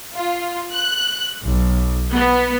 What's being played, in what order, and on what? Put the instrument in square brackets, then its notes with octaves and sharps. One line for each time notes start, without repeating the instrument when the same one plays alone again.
[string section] F4
F#6
B1
B3